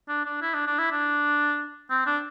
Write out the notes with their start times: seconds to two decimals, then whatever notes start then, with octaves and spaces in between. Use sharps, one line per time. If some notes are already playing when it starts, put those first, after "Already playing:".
0.08 D4
0.25 D4
0.42 E4
0.54 D4
0.67 D4
0.79 E4
0.92 D4
1.90 C4
2.07 D4